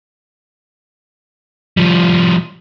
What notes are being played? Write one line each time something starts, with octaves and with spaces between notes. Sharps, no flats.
F3 G3